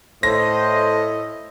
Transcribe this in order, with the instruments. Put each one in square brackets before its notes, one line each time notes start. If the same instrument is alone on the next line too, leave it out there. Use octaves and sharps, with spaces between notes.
[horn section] A2 [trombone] C5 [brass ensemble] D#5 [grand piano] A#6